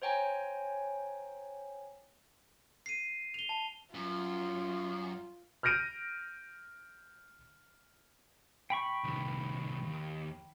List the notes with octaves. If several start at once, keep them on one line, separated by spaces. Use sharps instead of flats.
C5 C#5 G5 G#5 A#5
C7 D#7
F7 G7
A5
F#2 F4
F6 G6 A#6 D7 D#7
G5 B5 C#6
C2 D#3
D#2